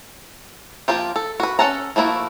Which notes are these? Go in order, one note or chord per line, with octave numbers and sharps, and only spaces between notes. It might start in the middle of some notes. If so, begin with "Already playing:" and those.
F3 A#3 F4 G4
A4
F#4 B4
C#4 A4 F#5 A5 A#5
F3 A3 A#3 E4 F#4